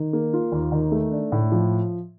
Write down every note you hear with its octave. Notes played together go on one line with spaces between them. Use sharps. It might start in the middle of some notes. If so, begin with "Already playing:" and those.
Already playing: D#3
A#3
F4
D#2
D#3
A3
D4
A2
F3